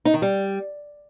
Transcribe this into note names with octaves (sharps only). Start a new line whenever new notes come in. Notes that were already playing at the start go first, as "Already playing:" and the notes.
D#4
D#3
G3